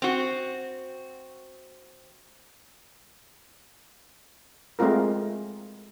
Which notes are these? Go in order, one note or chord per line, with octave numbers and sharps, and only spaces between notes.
C4 F#4
G#3 A3 C4 F4 A#4